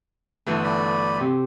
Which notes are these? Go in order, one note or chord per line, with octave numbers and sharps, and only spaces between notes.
G1 E3 A3 F#4 A4
D5 B5
C3